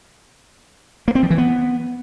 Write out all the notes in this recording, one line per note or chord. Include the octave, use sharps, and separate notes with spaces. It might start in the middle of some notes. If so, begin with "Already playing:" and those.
A#3
C4
F3
E3
B3